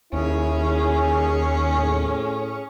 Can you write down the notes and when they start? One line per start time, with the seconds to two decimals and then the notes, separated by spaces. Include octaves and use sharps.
0.13 D#2 C#4 E4 G#4
1.76 A2